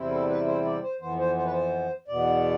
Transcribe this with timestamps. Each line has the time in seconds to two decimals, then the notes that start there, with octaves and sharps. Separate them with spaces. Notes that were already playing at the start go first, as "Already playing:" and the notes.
Already playing: E2 C3 G3 C4 E4
0.11 A4
0.28 B4
0.47 C5
0.65 D5
0.83 C5
1.00 F2 E3 B3 C5
1.19 C5
1.36 C5
1.44 B4
1.52 C5
2.08 E2 B2 B3 D5